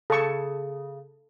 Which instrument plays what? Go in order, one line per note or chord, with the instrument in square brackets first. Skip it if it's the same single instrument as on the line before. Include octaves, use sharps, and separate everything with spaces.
[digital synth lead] C#3 [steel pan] A4 A5 C#6